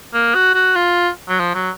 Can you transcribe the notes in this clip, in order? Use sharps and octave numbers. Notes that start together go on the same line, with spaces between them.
A#3
F#4
F#4
F4
F#3
F3
F#3